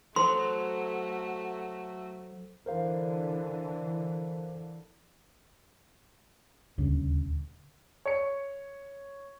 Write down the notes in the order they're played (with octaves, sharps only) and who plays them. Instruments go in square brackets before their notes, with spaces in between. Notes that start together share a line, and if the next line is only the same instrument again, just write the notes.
[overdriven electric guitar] F#3 [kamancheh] A3 F#4 [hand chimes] A4 C5 [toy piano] C6
[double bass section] D3 E3 [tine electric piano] A#4 C5 F5
[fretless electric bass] D#1 D2 C#3
[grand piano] C#5 C#7